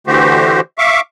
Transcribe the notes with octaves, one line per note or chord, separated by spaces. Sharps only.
D3 E3 A3 F#4 G4 C5
E5 F5 C#6 D6